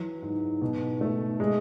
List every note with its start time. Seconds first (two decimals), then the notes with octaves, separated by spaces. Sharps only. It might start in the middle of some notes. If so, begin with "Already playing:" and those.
Already playing: E3 F#3
0.22 G#2
0.62 B2
1.01 A3
1.40 G#3